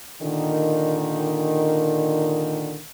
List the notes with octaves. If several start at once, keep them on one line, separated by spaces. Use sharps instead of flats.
A#2 D3 D#3